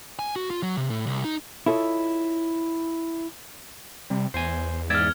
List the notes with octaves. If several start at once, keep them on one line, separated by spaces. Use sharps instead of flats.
G#5
F#4
F4
F#3
C3
A2
C2
D#4
E4 F4 A4 C#5 D#5
C3 G3
E2 C5 G#5
G#2 D5 E5 F6 G#6